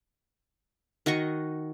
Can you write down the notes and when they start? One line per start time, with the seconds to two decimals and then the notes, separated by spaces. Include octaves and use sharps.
1.06 D#3 F#4 D#5 C#6